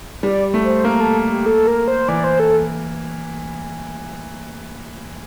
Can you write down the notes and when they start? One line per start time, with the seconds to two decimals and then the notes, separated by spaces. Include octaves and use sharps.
0.22 G3 D5
0.54 A3
0.64 C5
0.84 A#3 A#4
1.00 A4
1.31 G4
1.46 A4
1.67 A#4
1.88 C5
2.08 E3 D5
2.24 C5
2.40 A4